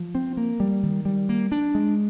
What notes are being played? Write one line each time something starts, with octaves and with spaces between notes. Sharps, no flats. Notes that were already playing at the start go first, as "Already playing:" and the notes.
Already playing: F3
C4
A#3
G3
D#3
G3
A#3
D4
G#3